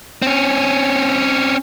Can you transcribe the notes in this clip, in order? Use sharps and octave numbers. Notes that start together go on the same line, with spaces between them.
C4 C#4